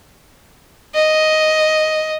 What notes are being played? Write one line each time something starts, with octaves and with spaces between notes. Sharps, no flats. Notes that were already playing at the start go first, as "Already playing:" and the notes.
D#5